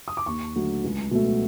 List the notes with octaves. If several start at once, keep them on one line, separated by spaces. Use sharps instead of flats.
D#6
D6
D#2 C#6
D3 F#3 A3
C#2
B2 F#3 A3